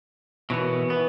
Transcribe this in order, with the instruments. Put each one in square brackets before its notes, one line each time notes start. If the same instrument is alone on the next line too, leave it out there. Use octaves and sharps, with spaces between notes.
[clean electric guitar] B2 E3 B3 [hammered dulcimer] B4 C#5
[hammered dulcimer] E3 [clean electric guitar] B3